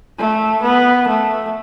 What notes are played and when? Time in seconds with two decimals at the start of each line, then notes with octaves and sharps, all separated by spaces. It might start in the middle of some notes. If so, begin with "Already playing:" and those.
0.18 A3
0.63 B3
1.08 A3